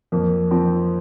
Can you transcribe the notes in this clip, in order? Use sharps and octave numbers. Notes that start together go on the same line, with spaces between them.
F2 A#3
F3 C4